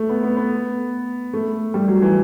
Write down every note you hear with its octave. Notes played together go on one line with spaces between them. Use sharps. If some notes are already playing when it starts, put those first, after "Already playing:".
Already playing: A3
B3
B3
B3
A3
G3
F#3
E3